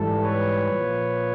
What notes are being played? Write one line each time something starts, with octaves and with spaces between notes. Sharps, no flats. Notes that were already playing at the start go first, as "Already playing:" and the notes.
Already playing: G#2 E3 G3 A4
B4 C#5
A#2 F3